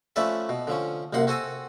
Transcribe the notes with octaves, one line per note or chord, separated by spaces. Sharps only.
F3 A3 C#4 B4 D5 E5
B2
D3 F3 C#4
C2 F#2 A#3 F#5 C6
C4 F#4 A4 G5 G#5